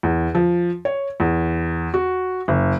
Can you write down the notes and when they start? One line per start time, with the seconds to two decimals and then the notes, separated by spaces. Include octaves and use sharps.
0.03 E2
0.35 F3
0.85 C#5
1.20 E2
1.94 F#4
2.48 F#1